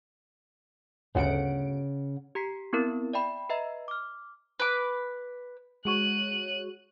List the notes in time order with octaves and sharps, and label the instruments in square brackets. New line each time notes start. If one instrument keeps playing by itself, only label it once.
[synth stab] G1 D2 D7 [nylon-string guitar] C#3 F#5
[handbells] G4 A#5 B6 C7
B3 C4 E4 A#4
D5 E5 G5 B5
B4 D#5 E5 A#5
D6 F6
[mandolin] B4 D6
[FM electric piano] G#3 F#4 C#5 [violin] F#6 D#7